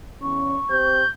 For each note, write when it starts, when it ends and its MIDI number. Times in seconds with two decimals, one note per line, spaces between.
0.22 0.57 40
0.22 0.57 61
0.22 1.06 85
0.70 1.03 60
0.70 1.03 67
0.70 1.03 72
0.70 1.11 91